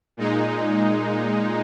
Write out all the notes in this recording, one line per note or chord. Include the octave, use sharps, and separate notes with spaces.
A#2 G#3 D#4